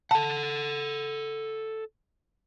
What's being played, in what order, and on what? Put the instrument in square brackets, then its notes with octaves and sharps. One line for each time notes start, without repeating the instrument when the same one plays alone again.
[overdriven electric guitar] A4 F#5 [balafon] A5